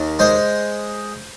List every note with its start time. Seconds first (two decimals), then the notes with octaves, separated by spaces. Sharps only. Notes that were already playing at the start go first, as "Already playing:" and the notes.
Already playing: D#2
0.19 G#3 C5